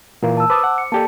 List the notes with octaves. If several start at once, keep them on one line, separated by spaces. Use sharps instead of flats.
A#2 E3 A#3 A#4
A5 E6
B4 C5 A5 D6 D#6
F#5
C#7
A#3 G4 A4 D5 A5